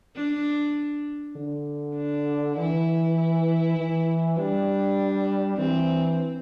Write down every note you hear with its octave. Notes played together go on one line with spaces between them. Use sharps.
D4
D3
D4
E3 E4
E4
E3
G3 D4
E3 C4